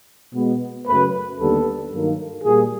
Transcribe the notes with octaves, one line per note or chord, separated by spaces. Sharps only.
B2 G#3 B3
F#2 C#3 F#3 A3 B4
D#2 D3 G3 B3 A4
G2 D#3 F#3 A#3
A#2 G3 A#3 G#4